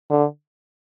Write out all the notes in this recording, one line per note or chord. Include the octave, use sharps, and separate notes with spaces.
D3